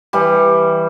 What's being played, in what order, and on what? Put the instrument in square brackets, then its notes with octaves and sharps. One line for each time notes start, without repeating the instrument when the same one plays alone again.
[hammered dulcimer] E3 G3